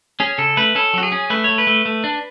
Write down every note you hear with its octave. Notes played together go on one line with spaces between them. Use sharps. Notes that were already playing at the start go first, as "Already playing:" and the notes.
C#4 G#4
C#3 A4
A3 B4
C#4 A4
F#3 F#4
G#4
C#4
A3 B4
A3 C#5
B4
A3
A3
D4